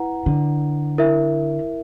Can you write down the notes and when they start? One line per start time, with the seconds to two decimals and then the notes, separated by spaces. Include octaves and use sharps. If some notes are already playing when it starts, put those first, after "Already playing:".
Already playing: E4 B4 F#5 A#5
0.26 D3
0.98 E4 A#4 E5